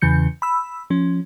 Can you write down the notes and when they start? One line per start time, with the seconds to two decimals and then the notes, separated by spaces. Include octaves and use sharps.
0.02 E2 C#3 E3 G6 C#7
0.42 B5 E6
0.90 F3 C#4